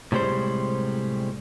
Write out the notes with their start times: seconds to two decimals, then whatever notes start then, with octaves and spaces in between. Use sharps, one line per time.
0.12 A2 C3 G3 G#3 C5